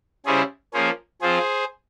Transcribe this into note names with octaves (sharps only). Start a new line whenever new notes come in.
C#3 G3 C#4 E4 G#4 C5
F3 A#3 C#4 G#4 C5
F3 C4 F4 G#4 C5